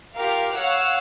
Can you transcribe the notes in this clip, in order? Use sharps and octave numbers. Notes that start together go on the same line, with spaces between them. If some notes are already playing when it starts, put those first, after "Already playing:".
F4 G4 A#4 F5
C#5 F5 F#5 E6 F#6